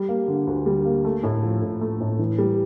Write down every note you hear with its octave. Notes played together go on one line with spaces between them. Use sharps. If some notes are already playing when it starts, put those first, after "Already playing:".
Already playing: G3
A#3
D3
D2
G3
A#3
A3
A2
F3
A2
A3
A2
E3
G3